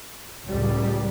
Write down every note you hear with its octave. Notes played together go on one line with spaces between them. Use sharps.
C#2 A2 G3